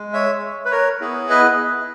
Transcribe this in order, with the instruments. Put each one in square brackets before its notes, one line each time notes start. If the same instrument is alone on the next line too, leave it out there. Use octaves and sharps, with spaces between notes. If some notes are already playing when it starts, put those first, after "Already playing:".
Already playing: [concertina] G#3
C#5 E5
B4
A#4 C#5
B3 E4 G#4
B4 D#5